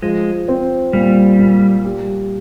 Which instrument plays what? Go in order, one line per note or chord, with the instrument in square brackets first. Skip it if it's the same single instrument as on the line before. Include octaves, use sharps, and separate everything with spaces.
[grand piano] F3 [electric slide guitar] G#3
[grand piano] C4
[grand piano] A#2 [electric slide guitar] G3
[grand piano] A#2
G3